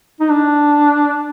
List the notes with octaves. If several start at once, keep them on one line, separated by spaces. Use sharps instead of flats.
D#4
D4